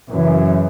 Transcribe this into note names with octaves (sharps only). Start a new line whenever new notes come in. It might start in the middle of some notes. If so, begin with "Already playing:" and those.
F#2 C#3 E3